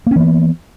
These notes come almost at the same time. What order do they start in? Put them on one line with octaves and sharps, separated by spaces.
A#3 C#4 E3 B3